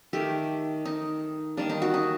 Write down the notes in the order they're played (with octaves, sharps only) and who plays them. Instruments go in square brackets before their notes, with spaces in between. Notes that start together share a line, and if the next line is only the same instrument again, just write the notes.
[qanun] D#3 A3 G4
D#4
D#3 G3 A#3 D4
D#4
F#4
D#4